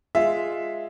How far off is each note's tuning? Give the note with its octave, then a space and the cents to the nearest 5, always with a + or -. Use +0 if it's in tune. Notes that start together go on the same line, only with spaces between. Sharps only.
G#3 +0 F4 +0 E5 +0